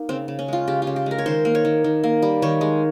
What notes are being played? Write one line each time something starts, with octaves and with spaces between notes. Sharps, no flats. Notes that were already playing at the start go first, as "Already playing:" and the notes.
Already playing: A#3 D#4
C#3 C4
C#3
C#4
G#3 F4
C#3 G4
F4
C#3
G4
G#3 A#4
C#5
D#3 C5
A#3
C#5
D#3
D#3
A#3
G3
D#3 C#5
G#3